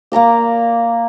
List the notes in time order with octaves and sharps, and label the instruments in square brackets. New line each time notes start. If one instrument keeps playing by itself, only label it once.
[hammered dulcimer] A#3 D5 A#5 D6